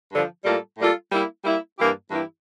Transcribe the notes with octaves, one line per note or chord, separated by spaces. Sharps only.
G2 D3 F3
A2 G3 A#3 F4 A4
A2 G3 A#3 F4 A4
G3 A#3 E4
G3 A#3 E4
G2 E3 A#3 E4 G4
G2 E3 A#3 E4 G4